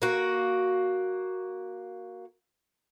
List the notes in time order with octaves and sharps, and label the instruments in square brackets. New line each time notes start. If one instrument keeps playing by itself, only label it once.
[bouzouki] A#3 F#4